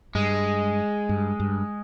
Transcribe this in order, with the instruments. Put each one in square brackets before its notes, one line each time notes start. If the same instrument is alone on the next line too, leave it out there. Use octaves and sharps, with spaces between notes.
[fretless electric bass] G2 [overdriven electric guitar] G#3
[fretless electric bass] G2
G2